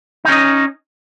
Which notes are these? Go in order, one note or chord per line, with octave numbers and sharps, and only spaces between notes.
C#4 D#4 D#5